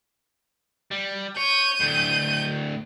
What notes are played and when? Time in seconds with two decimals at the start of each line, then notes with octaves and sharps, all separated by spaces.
0.91 G3
1.37 C#5 G6 D#7
1.80 D2 A2